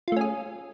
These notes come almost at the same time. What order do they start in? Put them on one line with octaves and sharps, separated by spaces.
F4 A3 C#4 G#4